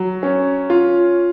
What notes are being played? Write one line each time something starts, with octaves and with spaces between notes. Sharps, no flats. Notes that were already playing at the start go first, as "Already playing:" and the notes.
Already playing: F#3
C#4
F4